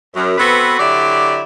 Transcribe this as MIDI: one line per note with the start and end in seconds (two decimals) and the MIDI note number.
0.15 0.35 42
0.38 0.77 59
0.38 0.77 60
0.38 0.77 66
0.38 0.77 69
0.38 0.77 71
0.79 1.43 50
0.79 1.43 54
0.79 1.43 64
0.79 1.43 67
0.79 1.43 74